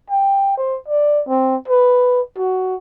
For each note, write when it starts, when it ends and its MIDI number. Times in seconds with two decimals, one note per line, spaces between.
0.11 0.53 79
0.58 0.78 72
0.88 1.22 74
1.27 1.56 60
1.68 2.21 71
2.38 2.76 66